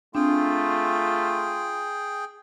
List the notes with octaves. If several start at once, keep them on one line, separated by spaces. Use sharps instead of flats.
A3 C4 D4 F4 G#4 G5